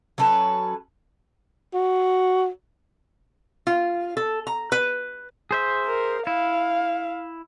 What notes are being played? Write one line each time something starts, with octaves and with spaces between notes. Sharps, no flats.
F#3 C#4 A4 B4
F#4
F4
A4
A#5
B4
G#4 C5 E5
A#4
E4 F5